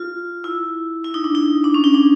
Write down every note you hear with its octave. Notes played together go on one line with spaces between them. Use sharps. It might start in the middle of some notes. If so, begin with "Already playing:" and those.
Already playing: F4
E4
E4
D#4
D4
D#4
D4
C#4
D#4
D4